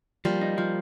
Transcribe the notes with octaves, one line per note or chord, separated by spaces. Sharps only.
F3 G3 A#3
D#4
F3